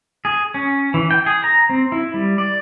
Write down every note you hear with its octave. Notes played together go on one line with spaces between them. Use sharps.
G#4
C#4
E3
G5
G#4
A#5
C4
E4
G3
D5